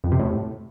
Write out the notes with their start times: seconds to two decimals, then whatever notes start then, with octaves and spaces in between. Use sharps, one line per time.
0.04 F2
0.12 C3
0.19 A2